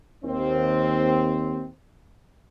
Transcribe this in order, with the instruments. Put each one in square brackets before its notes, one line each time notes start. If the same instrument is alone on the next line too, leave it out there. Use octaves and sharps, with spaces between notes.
[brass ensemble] D#2 C4